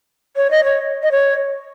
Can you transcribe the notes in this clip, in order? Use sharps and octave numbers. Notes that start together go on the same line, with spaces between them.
C#5
D#5
C#5
D#5
C#5